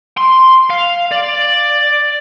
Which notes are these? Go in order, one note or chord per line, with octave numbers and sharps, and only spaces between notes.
C6
F5
D5